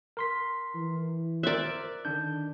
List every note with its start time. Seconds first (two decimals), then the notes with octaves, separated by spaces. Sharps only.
0.17 A#4 C6 B6
0.75 E3
1.43 A#4 C5 D5 E5 F#6
2.05 D3 D#3 D4 G6